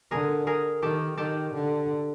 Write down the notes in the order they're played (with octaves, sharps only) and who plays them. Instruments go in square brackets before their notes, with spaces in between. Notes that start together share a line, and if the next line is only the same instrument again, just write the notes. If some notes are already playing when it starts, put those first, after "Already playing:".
[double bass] D3 [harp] G#4 A#4
[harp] G#4 A#4
[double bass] D#3 [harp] G4 A4
[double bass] D#3 [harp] G4 A4
[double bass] D3